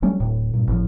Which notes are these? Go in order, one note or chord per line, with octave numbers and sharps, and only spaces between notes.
F#3 G3 A3 C#4
D1 A2
G2 A#2
G#1 A2 F3